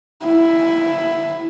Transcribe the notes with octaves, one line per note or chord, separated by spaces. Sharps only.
E4